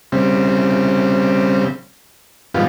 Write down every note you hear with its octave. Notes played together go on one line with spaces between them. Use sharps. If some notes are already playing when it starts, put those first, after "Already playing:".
C#3 G3 C4
G#2 D#3 F3 G3 B3 F4